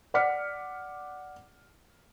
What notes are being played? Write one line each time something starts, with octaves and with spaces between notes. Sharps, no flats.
D5 F#5 D6 F6 B6 C#7